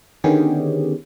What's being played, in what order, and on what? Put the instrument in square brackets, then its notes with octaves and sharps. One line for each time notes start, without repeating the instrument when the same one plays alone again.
[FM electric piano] D3 D#3 B3 C#4 G4 G#4